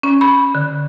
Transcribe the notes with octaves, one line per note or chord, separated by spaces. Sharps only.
C#4
B5
D3